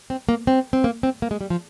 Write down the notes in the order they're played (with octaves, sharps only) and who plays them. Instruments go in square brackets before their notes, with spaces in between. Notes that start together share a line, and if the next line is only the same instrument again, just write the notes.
[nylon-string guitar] C4
A#3
C4
C4
A#3
C4
A#3
G#3
G3
F3